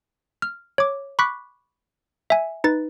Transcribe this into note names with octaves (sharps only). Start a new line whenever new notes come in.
F6
C#5 D6
B5 C#6 D6 F#6 B6
E5 G#5
D#4 B4 A6